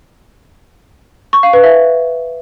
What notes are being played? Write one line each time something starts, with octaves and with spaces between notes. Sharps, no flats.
C#6
F5
B4
E5